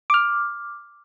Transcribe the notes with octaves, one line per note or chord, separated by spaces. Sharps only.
D6 F6